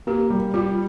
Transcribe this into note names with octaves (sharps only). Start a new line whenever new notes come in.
A#3 G4
G3
G3 F4